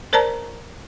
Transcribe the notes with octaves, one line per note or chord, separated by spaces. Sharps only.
A#4 C5 D5 A5 A#5